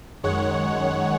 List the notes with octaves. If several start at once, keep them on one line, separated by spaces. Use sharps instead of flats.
F#2 D#3 G#3 C#5 F#5